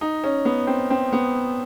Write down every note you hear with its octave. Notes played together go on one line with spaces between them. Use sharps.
D#4
C#4
B3
C4
C4
B3